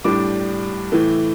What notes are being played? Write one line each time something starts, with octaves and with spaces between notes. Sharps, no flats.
A2 G3 D4 D6
A2 E3 A3